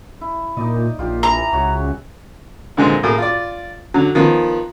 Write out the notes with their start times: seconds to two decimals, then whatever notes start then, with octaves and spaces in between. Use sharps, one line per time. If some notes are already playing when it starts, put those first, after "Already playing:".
0.21 E4
0.57 A#2 D#4 D5 D#5
0.99 A#1 F4 G4 D5
1.23 E3 E5 A#5
1.53 C#2 F#4 G#4 C#5
2.77 A#2 D3 E3 G#3 C4
3.03 A2 A#3 G#4 D#6
3.18 F4 D5
3.94 D3 F#3
4.15 D#3 F3 B3